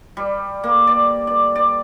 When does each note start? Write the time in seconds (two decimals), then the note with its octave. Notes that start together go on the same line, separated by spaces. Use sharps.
0.17 G3
0.64 A#3
0.87 D5
1.27 D5
1.55 D5